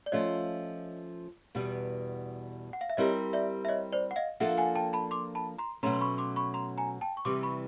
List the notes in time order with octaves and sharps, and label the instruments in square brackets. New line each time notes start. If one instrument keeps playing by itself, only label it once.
[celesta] D5
[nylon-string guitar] F3 A3 C#4 F4 [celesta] C#5 D#5
[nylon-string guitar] E2 B2 G3 B3
[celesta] F#5
F5
E5
[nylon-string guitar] G3 C4 E4 G4 A#4 [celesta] C#5 D#5
[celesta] D5 E5
E5
C#5 D#5
C5 D5
F#5
D#5 F5
[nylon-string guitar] F3 A#3 D4 F4 A4 [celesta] E5 F#5
[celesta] F#5 G#5
G5 A5
A5 B5
C6 D6
A5 B5
A#5 C6
[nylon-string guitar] B2 F#3 A3 C#4 [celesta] A#5 C6
[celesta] C6
B5 C#6
C6 D6
B5 C#6
A#5 C6
G#5 A#5
G5 A5
C#6
[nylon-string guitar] C3 E3 G3 [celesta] C6 D6
[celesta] B5 C#6